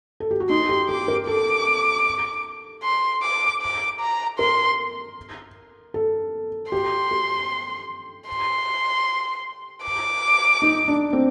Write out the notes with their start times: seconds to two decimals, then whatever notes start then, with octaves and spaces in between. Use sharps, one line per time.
0.20 A4
0.31 G4
0.40 F#4
0.50 D#4 C6
0.69 G4
0.89 G4 D6
1.08 A#4
1.27 A4 D6
2.83 C6
3.22 D6
3.62 D6
4.00 A#5
4.39 A#4 C6
5.94 A4
6.72 G4 C6
7.11 G4
8.28 C6
9.83 D6
10.62 D#4
10.88 D4
11.13 C4